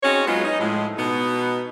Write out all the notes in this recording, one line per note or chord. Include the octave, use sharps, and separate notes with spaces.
C4 C#4 D#4 F#4 G#4 C#5
F#3 G#3 B3 D#4 F4
D#4
A2 F3 G#3
B2 B3 D#4